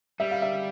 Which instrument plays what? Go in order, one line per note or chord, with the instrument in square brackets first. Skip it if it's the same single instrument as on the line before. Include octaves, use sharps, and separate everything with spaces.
[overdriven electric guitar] G3 [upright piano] E5
[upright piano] F5
E5